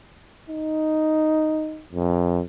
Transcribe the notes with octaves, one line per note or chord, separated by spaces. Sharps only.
D#4
F2